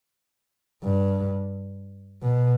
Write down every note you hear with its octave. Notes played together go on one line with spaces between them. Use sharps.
G2
B2